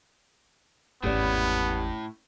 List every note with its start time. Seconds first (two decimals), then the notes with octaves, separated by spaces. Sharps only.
1.03 G#1 E2 A2 B3 C#4 G4 D5